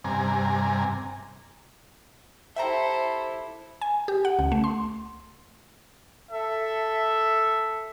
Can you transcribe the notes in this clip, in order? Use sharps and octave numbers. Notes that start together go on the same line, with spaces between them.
G2 C3 G#5 A#5
E4 G4 A4 C5 E5 G5 A#5
G#5
G4
F#5
C#2
A3
C6
A4 E5